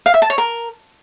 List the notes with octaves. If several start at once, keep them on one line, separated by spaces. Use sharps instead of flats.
F5
E5
A5
C#5
A#4